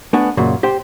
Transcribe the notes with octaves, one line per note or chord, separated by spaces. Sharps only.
A3 B3 D4 G#5
F#2 A#2 C#3
G4 C5 G5